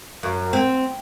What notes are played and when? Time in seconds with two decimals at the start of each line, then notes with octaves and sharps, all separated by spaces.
0.23 F#2
0.53 C4